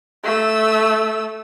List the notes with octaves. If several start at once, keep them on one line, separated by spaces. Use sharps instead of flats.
A3 E6